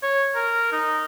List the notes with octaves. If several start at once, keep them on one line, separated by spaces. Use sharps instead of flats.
C#5
A#4
D#4